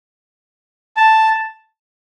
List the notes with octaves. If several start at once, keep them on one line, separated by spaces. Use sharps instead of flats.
A5